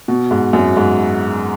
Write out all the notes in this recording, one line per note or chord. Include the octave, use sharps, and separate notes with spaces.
B2
G#2
F#2
G#2